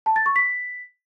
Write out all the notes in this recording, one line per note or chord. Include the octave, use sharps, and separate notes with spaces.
A5
A6
C#6
B6